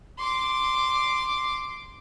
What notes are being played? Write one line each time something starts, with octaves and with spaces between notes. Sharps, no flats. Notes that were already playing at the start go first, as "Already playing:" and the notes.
C6 D6